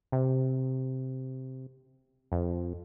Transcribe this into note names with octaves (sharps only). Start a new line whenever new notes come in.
C3
F2